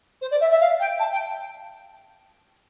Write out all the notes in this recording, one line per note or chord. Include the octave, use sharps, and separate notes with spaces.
C5
D5
E5
E5
F5
G5
A5
G5